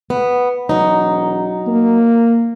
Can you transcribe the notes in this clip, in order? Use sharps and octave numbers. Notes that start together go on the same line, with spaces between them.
B3
E1 F#3 D#4
A#3